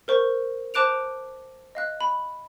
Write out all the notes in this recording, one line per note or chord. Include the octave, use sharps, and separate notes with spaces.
A#4 C5 C#6
C5 A5 D6 F#6 D7 F7
D#5 F5 F#6
B5